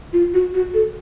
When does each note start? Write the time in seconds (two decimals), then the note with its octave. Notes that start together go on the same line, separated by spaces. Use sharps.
0.13 F4
0.34 F#4
0.54 F#4
0.74 A4